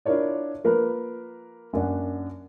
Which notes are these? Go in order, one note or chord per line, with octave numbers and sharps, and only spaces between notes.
D4 E4 F4 A#4 C#5 D5
F3 A#3 A#4 B4
F#2 A#3 D4 F#5